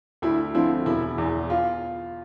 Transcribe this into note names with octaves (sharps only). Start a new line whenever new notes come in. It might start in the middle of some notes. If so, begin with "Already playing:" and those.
D2 E4
D3 F3 C4 E4
E1 E4
E2 E3
F4